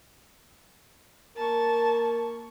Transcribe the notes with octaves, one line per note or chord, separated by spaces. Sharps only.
A#3 A#4 A5 C#6